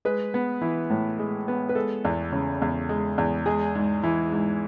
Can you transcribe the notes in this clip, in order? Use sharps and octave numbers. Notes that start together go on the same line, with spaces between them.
G#3 B4
B3
E3
A2
G#3
B3
B4
G#3 A4
E2
C#3
E2
G#3
E2
G#3 G#4
G#2
E3
G#2